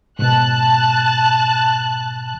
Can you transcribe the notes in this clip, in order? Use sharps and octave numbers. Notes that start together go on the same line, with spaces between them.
G#2 B2 A5 F#6